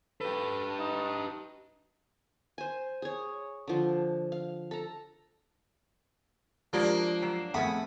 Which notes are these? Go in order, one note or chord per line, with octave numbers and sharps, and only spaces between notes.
G4 A4 B4
D#4
C5 G#5
G#4 C#5
D3 F3
F5
A4 A#5
F3 G#3 A#3 D4 G4 D#6
F#3 C7 E7
F2 A3 B3 C4 G#4 F#5 B5 D#6